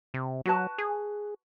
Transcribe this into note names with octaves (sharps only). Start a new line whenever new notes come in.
C3
F#3 F#4 B4 A5
G#4